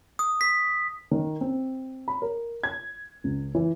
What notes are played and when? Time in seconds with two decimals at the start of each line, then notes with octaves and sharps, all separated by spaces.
0.19 D#6
0.41 B6
1.11 D#3
1.41 C4
2.08 B5
2.22 A#4
2.63 G#6
3.24 C#2
3.55 E3